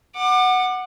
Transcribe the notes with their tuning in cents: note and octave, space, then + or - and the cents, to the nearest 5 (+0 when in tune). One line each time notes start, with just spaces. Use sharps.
F#5 +0 D6 +35